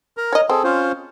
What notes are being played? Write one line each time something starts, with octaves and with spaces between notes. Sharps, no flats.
A#4 A#5
C#5 D#5
C4 G#4 A4
C#4 F4 C5